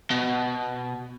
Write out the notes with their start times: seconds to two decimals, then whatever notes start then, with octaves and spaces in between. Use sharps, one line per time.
0.11 B2